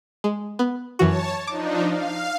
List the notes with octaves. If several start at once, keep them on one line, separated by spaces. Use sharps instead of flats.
G#3
B3
F#2 E3 F#4 C#5 A5
F3 D4 D#4 D6
F5